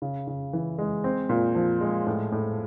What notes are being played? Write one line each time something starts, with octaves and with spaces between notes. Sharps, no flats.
C#3
C#3
E3
G#3
C4
A#2
F3
G#3
A2
A2